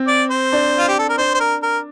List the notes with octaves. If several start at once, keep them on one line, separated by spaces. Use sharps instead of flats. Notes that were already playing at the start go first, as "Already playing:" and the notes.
Already playing: C4
D5
C5
D4
F4
G4
A4
A#4
D4 C5
C5
A#4
A#4